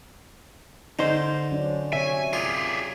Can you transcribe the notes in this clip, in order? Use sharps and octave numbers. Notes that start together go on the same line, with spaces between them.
D3 D#4 C5
F#3 C#4 D4
C3 C#5 E5 G#5
F4 G4 G#4